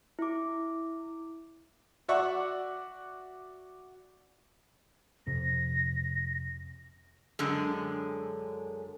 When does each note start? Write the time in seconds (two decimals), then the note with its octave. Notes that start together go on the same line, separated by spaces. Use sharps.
0.19 E4 D6
2.08 F#4 D5 E5 F#5 C#6
5.27 F2 C3 A#6
7.39 F#2 D3 G#3